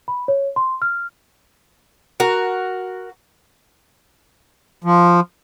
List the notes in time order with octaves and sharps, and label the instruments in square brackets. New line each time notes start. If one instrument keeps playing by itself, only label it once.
[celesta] B5
C#5
C6
F6
[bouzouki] F#4 A#4
[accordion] F3